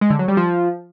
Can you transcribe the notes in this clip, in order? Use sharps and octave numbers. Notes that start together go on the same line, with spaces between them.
G#3
D3
F#3
G3
F3